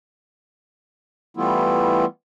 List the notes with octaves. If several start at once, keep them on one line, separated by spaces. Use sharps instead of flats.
E3 G3 A3 B3 E4 F4